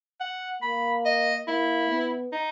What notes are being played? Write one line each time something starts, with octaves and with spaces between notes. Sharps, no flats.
F#5
A#3 B5
D#5
A#3 E4
B3
D#4